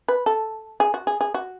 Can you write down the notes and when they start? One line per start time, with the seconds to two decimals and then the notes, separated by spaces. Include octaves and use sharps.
0.08 B4
0.26 A4
0.80 G#4
0.94 F#4
1.07 G#4
1.21 G#4
1.34 F#4